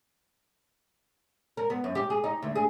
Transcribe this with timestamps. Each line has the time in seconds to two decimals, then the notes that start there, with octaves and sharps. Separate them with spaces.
1.57 A#4
1.70 B3
1.84 F#2
1.95 G4
2.10 G#4
2.24 D#4
2.42 D2
2.55 G#4